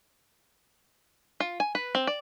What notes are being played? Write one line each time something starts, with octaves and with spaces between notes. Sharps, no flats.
F4
G#5
B4
C4
D5